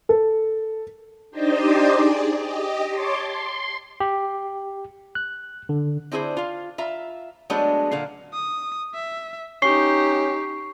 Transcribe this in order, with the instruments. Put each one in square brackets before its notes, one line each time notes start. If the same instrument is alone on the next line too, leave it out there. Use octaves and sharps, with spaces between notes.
[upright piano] A4
[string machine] D4 D#4 G4 C5 D5 D#5
G#4 D5
G4 D#5
C#5 A5 C6 D6
C6
[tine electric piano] G4
F#6
D3
[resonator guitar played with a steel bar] C4 D4 E4 G#4 A#4 C5
F4 F5
F4 E5 A#5
F#3 G#3 A3 B3 D4
A#2 D3 F5
[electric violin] D#6
E5
[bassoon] C#4 [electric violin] D#4 G4 [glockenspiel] C#6 C7